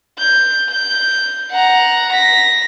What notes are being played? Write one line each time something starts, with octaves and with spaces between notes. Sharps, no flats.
G6
G6
F#5 A#5
A#6 B6